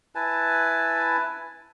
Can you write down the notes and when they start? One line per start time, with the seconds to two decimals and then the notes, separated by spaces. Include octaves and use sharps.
0.15 E4 B4 G#5 A5